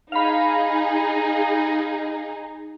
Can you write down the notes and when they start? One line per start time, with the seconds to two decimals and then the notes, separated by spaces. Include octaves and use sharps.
0.12 D#4 G#4 F5 B5